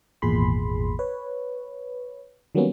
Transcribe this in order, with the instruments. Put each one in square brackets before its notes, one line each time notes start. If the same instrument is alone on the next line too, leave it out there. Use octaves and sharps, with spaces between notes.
[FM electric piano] G#1 E2 A#2 G#4 B5 C6
B4 C#5
D#3 F#3 G3 A#3 B3 C#4